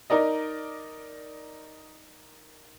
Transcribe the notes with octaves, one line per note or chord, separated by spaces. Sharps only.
D#4 A#4 D5 D#5